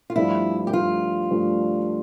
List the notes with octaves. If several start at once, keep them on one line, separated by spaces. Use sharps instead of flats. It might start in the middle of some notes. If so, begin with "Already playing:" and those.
F4
G2 F3 A3 D4 E4
G4
G2 F3 A3 D4 F4
G2 F3 A3 D4